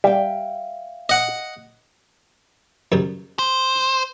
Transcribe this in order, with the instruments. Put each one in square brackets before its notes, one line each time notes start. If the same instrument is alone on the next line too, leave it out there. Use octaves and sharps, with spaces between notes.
[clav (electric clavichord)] G3 [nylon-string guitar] E5 F5 G5
[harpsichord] D#5 F#5
F#2 C#3 G3
[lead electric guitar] C5